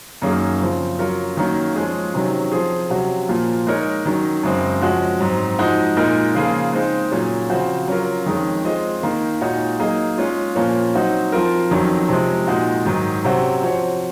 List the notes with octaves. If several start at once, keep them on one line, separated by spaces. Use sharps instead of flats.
F#2 D#3 A#3 C#4 G#4
C#3 F3 C4
F#3 C#4 F4 A#4 C#5
D#3 F#3 A#3 C#4
F3 G#3 C#4 F4 G#4
C3 D#3 F#3 C#4
F3 C4 F4 G#4
C3 F#3 C#4 F#4
A#2 F3 A#3
G#3 D#4 A#4 C#5
D#3 F#3 C#4
F#2 C#3 G#3 C4
F3 G#3 C#4 F#4
G#2 F#3 C4
F3 G#3 D#4 F#4
A#2 G#3 D#4 A#4
C#3 F3 A#3 F4 G#4
G#3 C4 D#4
A#2 F#3 C#4 G#4
C#3 F3 C4 F#4 C5
F#3 C#4 F4 A#4
F2 D#3 G#3 C#4 G#4
G#3 C4 F4 G#4 D#5
D#3 A#3 D#4
A#2 G#3 D#4 F#4 C#5
F#3 A#3 D#4 G#4 D#5
G#3 C#4 F4
A#2 F3 A#3 C#4
F#3 C4 D#4 F#4
F3 C4 F4 A#4
F2 D#3 F#3 C#4
C3 F3 G#3
A#2 G#3 D#4 F#4
G#2 D#3 F#3
C3 F#3 C#4 F#4 C5
F3 C4 F#4 C#5